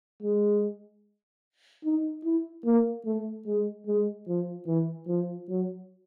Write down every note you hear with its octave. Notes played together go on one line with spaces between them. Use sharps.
G#3
D#4
E4
A#3
A3
G#3
G#3
F3
E3
F3
F#3